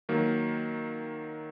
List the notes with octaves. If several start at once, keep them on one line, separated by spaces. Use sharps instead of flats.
D#3 F#3 A#3